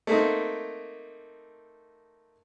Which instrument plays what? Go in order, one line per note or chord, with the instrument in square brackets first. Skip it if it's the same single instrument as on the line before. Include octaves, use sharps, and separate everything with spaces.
[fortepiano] A3 A#3 C4 D#4